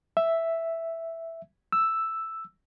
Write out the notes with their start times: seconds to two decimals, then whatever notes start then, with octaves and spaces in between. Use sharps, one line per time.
0.17 E5
1.72 E6